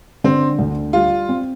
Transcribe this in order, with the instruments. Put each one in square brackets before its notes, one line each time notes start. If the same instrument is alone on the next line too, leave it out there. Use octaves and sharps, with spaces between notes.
[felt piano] D3 [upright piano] C4
[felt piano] D2
[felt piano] G3 [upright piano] F4
[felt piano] C4